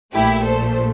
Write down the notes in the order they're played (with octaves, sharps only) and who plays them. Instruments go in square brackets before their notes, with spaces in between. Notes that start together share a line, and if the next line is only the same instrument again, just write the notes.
[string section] A#1 A#2 A3 E4 G4
A4 C5